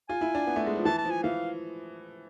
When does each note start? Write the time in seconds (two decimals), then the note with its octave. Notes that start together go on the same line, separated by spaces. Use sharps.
0.09 F4 G#5
0.21 E4
0.35 D4
0.47 B3
0.56 A3
0.66 G#3
0.76 F3
0.85 E3 A5
0.99 A5
1.05 F3
1.11 G#5
1.23 E3 F5